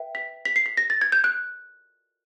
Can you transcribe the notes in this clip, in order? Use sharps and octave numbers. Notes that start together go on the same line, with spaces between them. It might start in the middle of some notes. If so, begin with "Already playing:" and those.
Already playing: B4 E5 G5
B6
B6
C7
B6
A#6
A6
G#6
G6
F#6